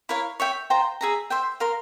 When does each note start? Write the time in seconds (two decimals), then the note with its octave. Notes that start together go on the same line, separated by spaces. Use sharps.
0.09 E4 A#4 C#5 F5
0.40 C#5 E5 G5
0.70 F4 C5 G5 A#5
1.01 G#4 E5 A#5
1.30 C5 E5 G5
1.60 A#4 F5 C6